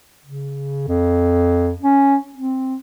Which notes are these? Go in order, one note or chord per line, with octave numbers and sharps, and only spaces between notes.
C#3
F2
C#4
C4